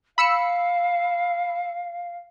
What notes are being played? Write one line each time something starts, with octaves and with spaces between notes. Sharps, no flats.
F5 B5 E6 C#7